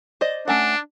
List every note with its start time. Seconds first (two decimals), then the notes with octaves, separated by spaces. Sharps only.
0.21 C5 D5 D#5
0.48 A3 C#4 D4 F#5